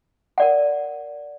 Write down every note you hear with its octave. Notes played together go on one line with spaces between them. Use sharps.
A#4 D5 F#5